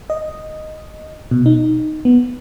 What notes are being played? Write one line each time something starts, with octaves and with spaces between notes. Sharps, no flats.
D#5
B2
D#4
B3